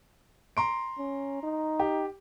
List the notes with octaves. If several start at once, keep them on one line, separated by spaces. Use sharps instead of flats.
A#5 C6 D7
C#4
D#4
G4